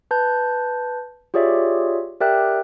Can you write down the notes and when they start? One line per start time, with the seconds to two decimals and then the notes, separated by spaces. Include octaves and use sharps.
0.11 B4 A5 G6
1.34 F4 G4 G#4 C#5 D5 E5
2.20 G4 A#4 D5 E5 G5 F#6